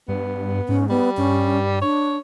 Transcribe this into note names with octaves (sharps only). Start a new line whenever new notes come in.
G2 B3
G#2 C#4
G3 B3
G2 C#4
D4 C#5